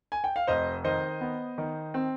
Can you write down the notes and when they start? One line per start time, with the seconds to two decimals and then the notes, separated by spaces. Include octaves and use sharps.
0.12 G#5
0.24 G5
0.36 F5
0.47 F1 C5 D#5
0.84 D#3 C5 D#5
1.21 B3
1.58 D#3
1.94 C4